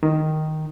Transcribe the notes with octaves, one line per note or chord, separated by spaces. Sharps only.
D#3